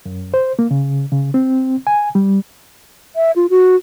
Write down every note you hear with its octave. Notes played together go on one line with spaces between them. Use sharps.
F#2
C5
A#3
C#3
C#3
C4
G#5
G3
E5
F4
F#4